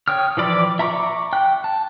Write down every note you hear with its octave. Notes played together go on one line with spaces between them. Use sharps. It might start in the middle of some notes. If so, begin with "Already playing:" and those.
C#5 G5 D#6 F6
E3 F3 D5 B5 E6
E5 A#5 B5 C#6 D6
G5 F#6
A5